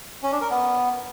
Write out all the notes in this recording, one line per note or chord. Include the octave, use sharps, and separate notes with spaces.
C#4
D4
A#4
B3